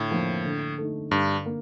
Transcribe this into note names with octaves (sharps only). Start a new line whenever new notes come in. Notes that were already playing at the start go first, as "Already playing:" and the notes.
Already playing: A2 D3
F3 A#3 F4
D3
A3 D#4
G2 D3
A#3